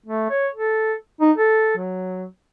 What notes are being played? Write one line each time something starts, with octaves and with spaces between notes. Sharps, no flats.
A3
C#5
A4
D#4
A4
F#3